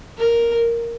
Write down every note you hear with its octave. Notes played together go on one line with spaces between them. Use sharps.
A#4